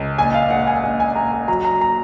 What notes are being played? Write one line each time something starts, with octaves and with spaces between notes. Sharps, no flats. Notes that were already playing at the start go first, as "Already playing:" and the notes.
Already playing: C#2
A#1 G#5
F5
A#1 F#5
G#5
A#1
G#5
A#1 A#5
F#3 A#5
A#5
A#5